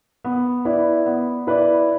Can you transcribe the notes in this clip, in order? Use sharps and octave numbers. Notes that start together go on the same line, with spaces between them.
B3
E4 B4 D5
B3
E4 B4 D5